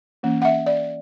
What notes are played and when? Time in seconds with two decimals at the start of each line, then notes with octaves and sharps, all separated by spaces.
0.23 E3 A#3 C#4
0.42 F#5
0.45 E5
0.66 D5